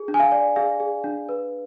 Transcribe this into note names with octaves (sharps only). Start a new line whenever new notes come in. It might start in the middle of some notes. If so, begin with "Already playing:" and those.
Already playing: G#4
D4
G#5
F5
D5
G#4 F5
G#4
D4
B4